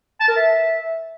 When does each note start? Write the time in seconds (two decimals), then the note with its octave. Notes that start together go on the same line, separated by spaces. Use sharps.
0.20 A5
0.28 A#4
0.37 E5